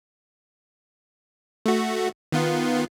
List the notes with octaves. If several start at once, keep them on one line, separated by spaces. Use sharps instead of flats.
A3 F#4
D#3 B3 F4